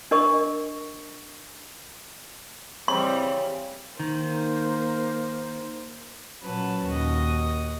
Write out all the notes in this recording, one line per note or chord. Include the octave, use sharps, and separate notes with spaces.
D4 A#4 D#5 C#6
C#3 E3 G3 C4 C6
D#3 A#3 C5
A#2 F#3 C#4 B4 A5
D#2 A#2 F#4 D#5